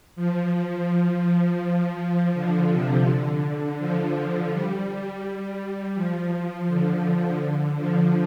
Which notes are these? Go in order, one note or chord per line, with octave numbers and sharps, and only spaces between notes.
F3
D3
C3
D3
F3
G3
G3
G3
F3
D3
D3
F3